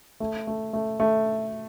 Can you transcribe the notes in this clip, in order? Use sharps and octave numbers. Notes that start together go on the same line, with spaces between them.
A3
A3
A3
A3